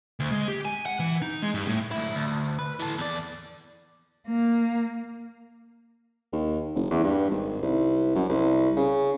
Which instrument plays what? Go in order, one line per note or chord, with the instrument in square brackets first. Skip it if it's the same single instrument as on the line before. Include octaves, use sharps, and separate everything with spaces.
[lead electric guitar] D2
G#3
G4
G#5
F#5
E3
D#4
G#3
G2
A2
[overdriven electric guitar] D2 E4
D2
B4
E3 A4
E2 D5
[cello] A#3
[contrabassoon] D#2
F#1
E2
G2
G#1
C2
F#2
C2
C#3